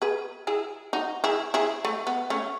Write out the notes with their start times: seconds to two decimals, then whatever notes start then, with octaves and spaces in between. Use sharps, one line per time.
0.02 G#4 B4
0.47 E4 G#4
0.93 D#4 F#4
1.24 E4 G#4
1.54 E4 G#4
1.85 A3
2.07 B3
2.30 A3 C#4